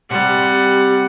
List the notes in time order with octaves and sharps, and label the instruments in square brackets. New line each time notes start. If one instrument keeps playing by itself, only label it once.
[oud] C3 [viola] G3 F#5